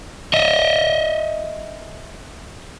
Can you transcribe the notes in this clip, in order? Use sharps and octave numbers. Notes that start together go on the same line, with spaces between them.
D#5 E5